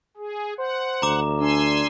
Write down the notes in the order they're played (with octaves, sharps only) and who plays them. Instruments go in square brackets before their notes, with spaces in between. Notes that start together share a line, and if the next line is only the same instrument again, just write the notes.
[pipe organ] G#4
[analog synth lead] C5 [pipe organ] F#5
[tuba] D2 [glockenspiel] A#5 D6 E7
[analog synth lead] D4 [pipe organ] G#5 C6 E6